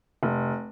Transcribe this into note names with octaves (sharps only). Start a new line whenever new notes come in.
F1